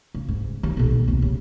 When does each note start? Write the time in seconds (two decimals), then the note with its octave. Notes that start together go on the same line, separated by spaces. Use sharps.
0.15 C#3
0.28 G#2
0.63 D#2
0.77 B1 A#2
1.08 D#2 C3
1.22 C#3